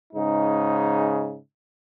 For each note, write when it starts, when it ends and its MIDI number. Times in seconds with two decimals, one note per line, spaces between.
0.14 1.39 44
0.14 1.39 49
0.14 1.39 63